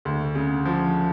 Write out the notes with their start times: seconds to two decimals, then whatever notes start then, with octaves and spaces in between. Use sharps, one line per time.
0.05 D2
0.35 C#3
0.65 F3